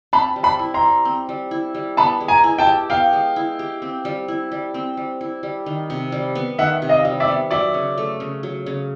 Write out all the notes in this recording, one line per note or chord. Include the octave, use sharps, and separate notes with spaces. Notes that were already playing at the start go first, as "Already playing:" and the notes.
C4 A5 B5
G3
A5 B5
E4
A#5 C6
G3
C4
G3
E4
G3
B3 A5 B5
G#3
G#5 A#5
E4
G5 A5
G4
B3 F5 G5
G#3
E4
G4
C4
G3
E4
G3
C4
G3
E4
G3
D#3
C3
G3
B3
D#3 E5 F#5
C3
D#5 F5
G3
D5 E5
B3
F#3 D5 E5
C#3
A3
C#3
F#3
C#3